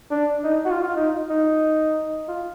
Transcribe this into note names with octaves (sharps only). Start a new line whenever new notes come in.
D4
D#4
F#4
F4
F4
D#4
D#4
F4